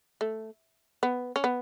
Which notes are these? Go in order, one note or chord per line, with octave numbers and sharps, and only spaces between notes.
A3
B3
C#4
B3